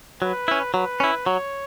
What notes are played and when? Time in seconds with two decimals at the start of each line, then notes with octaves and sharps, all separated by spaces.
0.22 F#3 B4
0.48 C#4 E4
0.74 F#3 B4
1.00 C#4 E4
1.26 F#3 C#5